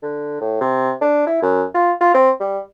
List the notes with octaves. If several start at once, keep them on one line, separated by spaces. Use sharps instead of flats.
D3
A2
C3
D4
E4
F#2
F4
F4
C4
G3